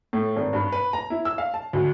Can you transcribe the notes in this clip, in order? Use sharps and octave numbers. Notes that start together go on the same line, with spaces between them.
A2
G#1
G2
B4
A#5
E4
E6
F5
A5
D2